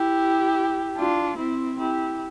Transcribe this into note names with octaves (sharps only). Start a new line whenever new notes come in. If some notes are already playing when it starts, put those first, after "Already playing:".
Already playing: E4 G4
D4 F4
C4 E4
E4 G4